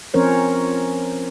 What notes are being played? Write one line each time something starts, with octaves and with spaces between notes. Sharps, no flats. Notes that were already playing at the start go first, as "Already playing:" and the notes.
F3 C4 C#4 A#4 C5 C#5